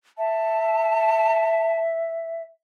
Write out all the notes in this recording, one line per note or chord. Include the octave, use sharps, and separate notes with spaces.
E5 A5